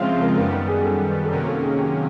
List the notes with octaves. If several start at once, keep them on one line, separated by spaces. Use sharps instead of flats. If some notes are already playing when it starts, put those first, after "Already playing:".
Already playing: C#3 F3 G#3 C4 F4 E5 F5
A#4
F#2 D#3 G3 B3 A#4
A#4
G#4
A4
A4
C3 D#3 F#3 A#3 C#4 A#4
A4
G#4
G4